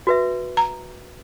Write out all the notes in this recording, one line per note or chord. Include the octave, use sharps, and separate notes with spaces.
F#4 B4 E5
A#5